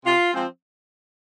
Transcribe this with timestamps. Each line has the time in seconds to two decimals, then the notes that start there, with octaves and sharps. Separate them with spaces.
0.05 C3 F4
0.34 F3 G#3 C4